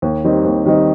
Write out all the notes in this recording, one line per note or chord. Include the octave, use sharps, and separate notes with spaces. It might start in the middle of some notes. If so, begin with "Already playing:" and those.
D#2
D#3 G3 C4 D#4
D#2
D#3 G3 C4 D#4